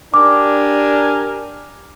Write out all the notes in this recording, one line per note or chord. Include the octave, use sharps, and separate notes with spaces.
D4 G4 A#4 G#5 D6